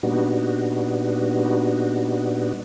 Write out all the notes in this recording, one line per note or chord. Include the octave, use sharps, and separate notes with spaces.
A#2 G3 B3 D4 D#4 F#4